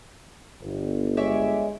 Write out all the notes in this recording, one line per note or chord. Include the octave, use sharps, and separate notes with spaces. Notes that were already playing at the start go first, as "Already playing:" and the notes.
G1
G#3 C#5 D5 E5